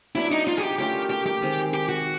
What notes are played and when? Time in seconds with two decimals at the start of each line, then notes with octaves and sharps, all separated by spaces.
0.15 F#3 B3 D4 E4
0.32 D#4
0.48 F4
0.57 G#4
0.63 G4
0.79 A3 C#4 F4 G4 A#4
1.10 G4
1.26 G4
1.42 D#3 G#3 C4
1.74 G4
1.89 F#4